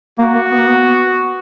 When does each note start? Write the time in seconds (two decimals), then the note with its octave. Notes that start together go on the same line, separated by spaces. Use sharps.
0.19 A#3 F#4
0.35 A#3
0.51 B3
0.59 A#3
0.67 B3